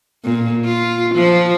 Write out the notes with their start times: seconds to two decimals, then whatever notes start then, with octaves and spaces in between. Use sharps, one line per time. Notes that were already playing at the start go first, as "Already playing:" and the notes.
0.24 A#2
0.65 F4
1.15 F3